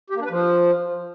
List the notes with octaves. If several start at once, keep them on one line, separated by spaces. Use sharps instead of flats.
G4
A#3
D4
B4
F3